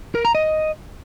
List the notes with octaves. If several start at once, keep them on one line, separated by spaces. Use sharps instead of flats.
A#4
A#5
D#5